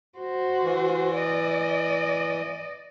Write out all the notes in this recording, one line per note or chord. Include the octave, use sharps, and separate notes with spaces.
F#4 C5
E3
D5 D#5